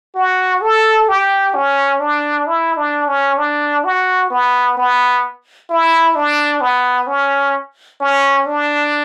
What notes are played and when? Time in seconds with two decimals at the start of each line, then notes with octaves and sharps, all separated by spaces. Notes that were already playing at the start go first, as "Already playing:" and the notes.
0.16 F#4
0.62 A4
1.09 G4
1.55 C#4
2.00 D4
2.47 E4
2.77 D4
3.08 C#4
3.38 D4
3.85 F#4
4.31 B3
4.78 B3
5.70 E4
6.16 D4
6.61 B3
7.07 C#4
8.01 C#4
8.46 D4